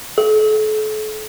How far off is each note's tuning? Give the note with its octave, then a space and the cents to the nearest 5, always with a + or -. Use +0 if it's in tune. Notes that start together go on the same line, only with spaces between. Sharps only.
A4 -40